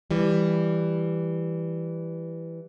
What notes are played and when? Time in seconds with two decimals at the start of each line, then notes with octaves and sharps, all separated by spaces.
0.11 E3 G3